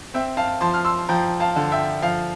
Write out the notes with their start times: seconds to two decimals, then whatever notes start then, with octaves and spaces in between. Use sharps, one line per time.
0.14 C4 E5 G5
0.37 F5 A5
0.61 F3 A5 C6
0.74 F6
0.85 C6 E6
1.08 F3 G5 A#5
1.40 F5 A5
1.56 D3
1.72 E5 G5
2.02 F3 F5